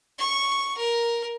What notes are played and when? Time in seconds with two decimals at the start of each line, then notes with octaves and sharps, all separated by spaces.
0.18 C#6
0.77 A#4